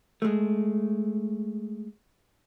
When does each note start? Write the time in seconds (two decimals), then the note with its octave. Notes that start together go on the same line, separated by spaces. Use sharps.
0.22 G#3 A3